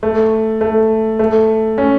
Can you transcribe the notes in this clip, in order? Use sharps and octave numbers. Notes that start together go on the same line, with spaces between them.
A3
A3
A3
C#4